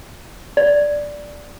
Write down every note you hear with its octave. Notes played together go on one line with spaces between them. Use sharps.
D5